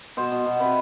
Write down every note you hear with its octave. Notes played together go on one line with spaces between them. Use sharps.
B2 C5
B2
B2
C3 B4